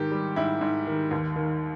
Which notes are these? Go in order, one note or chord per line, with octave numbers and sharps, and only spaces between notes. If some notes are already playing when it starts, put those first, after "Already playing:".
Already playing: G#2 D#3 G4
G3
G#2 E4
G#2
D#3
D#2
D#3